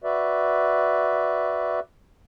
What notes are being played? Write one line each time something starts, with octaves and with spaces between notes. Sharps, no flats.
F#4 B4 D5 E5